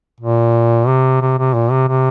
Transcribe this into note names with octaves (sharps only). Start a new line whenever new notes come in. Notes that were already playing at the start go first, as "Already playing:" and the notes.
A#2
C3
C3
C3
A#2
C3
C3